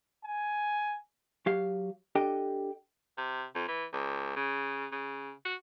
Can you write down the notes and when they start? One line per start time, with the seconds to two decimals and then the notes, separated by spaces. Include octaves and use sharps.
0.25 G#5
1.46 F#3 G4 F5
2.15 D4 G4 A4 D#5 G5
3.17 C3
3.55 F2
3.68 E3
3.93 C#2
4.36 C#3
4.92 C#3
5.45 F#4